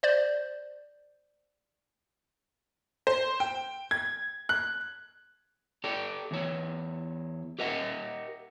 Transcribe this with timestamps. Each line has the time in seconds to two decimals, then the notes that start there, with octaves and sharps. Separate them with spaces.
0.03 C5 D5 G6
3.07 C5
3.40 G5
3.91 G#6
4.49 F#6
5.84 G4 A4 D5
6.31 E2 E3 C#5
7.59 G4 A#4 D#5 E5 F#5